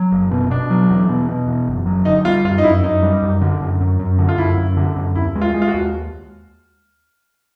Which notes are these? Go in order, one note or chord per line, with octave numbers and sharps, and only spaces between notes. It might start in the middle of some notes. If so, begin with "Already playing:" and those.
Already playing: F#3
F#1
B2
B2 D4
F#3
E2
B2
B2
E2
F#1
F#3
D3 D#4
G3 F4
F#2 F4
D#4
F#2 E4
F#2 D#4
G3
F#2
D3
F#2
F#2
F#2
D3
F4
F#2 E4
F#2
D3
F#2
D#2 E4
G#3
F4
G#3
F4
F#4
D#2